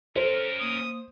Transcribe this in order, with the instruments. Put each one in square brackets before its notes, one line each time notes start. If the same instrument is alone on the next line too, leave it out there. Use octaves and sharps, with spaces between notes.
[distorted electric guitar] C#4 A#4 [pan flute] A4 [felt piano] C5
[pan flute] A#3 [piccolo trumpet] D#6